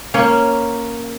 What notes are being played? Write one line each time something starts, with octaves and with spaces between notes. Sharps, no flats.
A#3 C#4 C#5